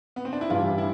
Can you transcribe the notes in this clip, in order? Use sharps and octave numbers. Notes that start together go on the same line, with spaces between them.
B3
C4
D4
E4
A1 G2 E3 G3 F4
E4